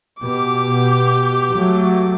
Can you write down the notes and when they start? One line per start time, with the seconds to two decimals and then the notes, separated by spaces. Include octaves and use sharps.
0.21 B2 G4 D6
1.54 F#3 A3